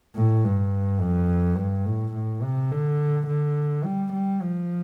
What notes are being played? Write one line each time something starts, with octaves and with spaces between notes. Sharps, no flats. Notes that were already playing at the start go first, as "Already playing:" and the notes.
A2
G2
F2
G2
A2
A2
C3
D3
D3
G3
G3
F3